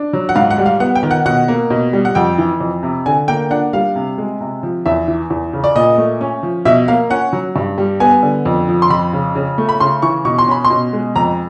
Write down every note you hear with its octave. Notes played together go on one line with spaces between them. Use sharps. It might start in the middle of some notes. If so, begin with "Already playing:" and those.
Already playing: D4
F#3
F#5
G#2 F5
F#5
G3
F5
B3 F#5
G5
D#3
F#5
B2 F#5
A#3
B2
G3
F#5
F2 G5
E3
F2
C3
D3 G#5
A#3 G5
D4 F#5
G3 F5
C3
G#3
C3
F3
E2 E5
E3
E2
C#3
D5
A#2 D#5
A3
C#4
F3
B2 E5
A#3 F5
C#4 F#5
F#3
G2
G3
B3 G#5
D3
F2
F3
C6
F2 B5
C#3
C#3
A3
B5
C#3 C6
E3 C#6
B2 C#6
C6
C#4 B5
C6
B2
G#3
F2 A#5